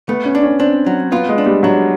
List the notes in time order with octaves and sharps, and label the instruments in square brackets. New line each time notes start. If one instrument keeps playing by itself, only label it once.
[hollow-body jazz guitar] A3 [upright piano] B3
[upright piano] C#4
[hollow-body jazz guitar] D4
[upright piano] C#4
[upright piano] C4 [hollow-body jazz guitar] D4
[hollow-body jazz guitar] F#3
[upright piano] B3 [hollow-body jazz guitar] F4
[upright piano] G#3
[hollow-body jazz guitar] D4
[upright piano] G3
[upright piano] F#3 [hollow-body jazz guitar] D4